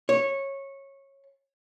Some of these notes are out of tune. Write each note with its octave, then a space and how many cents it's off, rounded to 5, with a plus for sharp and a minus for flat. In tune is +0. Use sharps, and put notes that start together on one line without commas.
C#5 -15